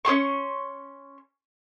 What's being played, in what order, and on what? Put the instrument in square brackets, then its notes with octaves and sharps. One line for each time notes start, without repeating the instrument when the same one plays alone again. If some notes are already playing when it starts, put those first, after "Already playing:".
[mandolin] C#4 G#4 C6 C#6